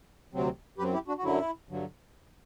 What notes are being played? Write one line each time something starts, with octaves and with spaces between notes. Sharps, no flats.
D2 C3 F#3 C4
F#2 F#3 C4 G4 B4
E4 G4
D4 F#4
F#4
F#2 D3 F#3 E4
G2 D3 F#3